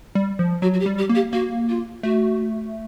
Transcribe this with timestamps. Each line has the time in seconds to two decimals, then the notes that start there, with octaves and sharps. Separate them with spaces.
0.15 G3
0.39 F3
0.62 F#3 F#4
0.73 F#4
0.80 G4
0.86 G3
0.98 G4
1.09 A#3
1.15 G4
1.32 A#3 F#4
1.69 F4
2.03 A3 F#4